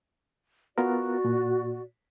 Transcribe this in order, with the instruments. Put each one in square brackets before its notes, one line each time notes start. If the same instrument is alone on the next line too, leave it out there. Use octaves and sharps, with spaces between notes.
[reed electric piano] B3 F4 A#4 [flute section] F#4 D5
[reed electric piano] A#2